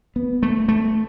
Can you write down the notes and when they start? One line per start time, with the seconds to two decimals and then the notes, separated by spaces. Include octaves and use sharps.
0.16 B3
0.43 A3
0.68 A3